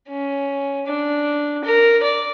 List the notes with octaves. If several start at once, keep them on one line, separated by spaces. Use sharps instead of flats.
C#4
D4
A#4
D5